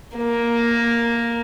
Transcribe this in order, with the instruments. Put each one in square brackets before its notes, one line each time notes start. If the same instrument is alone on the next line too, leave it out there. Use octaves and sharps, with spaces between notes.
[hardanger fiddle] A#3